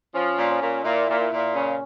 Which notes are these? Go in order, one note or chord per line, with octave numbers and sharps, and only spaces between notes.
F3 C#4
A#2
C#4
A#2
A#2 E4
A#2
E4
A#2
C#3 C#4